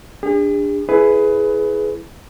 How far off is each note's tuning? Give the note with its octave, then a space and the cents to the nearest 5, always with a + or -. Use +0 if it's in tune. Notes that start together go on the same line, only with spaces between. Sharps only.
D4 +0 G#4 -45
E4 +0 G#4 +20 B4 +15